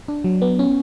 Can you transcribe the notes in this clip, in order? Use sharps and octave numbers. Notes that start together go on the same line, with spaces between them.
D4
F#3
B3
C#4